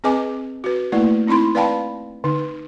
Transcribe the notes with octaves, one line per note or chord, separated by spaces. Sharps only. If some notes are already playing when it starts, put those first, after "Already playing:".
C4 G#4 B4 D#5 G#5 D6
F#4 B4
A3 A#3 E4 B4 D5
C4 D#4 E4 B5 C6
B4 D5 F5 G5 A5 B5
D3 D#4